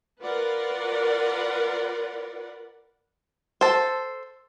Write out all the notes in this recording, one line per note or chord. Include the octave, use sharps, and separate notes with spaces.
F4 A#4 B4 D5 F#5
A4 C5